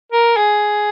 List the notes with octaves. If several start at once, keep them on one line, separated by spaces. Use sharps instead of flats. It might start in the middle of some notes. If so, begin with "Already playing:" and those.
A#4
G#4